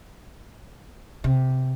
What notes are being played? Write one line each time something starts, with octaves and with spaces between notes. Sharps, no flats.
C3